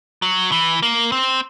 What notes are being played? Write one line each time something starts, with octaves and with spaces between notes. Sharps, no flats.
F#3
E3
A#3
C4